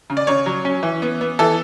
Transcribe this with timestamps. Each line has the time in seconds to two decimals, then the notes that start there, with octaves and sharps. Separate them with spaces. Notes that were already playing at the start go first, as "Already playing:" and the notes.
0.10 C#3
0.17 D5
0.27 C#3 C#5
0.46 F#3
0.65 C#4
0.83 E3
1.02 B3
1.21 B3
1.39 E3 A4